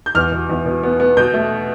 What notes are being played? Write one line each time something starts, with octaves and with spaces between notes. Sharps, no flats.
G6
E2 F6
B2
E2
B2
B3
B3
B2 G6
A3